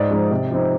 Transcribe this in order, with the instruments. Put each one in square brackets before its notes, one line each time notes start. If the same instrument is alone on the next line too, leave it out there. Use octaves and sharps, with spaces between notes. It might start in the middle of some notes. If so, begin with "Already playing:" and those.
Already playing: [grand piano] G#2 D5
F3 G#3 D#4
C3
F3 C4 D#4